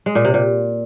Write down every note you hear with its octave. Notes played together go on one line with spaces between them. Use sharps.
G#3
A#2
C3
A#2